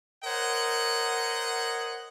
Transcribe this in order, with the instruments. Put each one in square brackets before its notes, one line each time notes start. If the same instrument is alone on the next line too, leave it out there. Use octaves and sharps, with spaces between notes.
[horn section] A#4 C5 C#5 D#5 F#5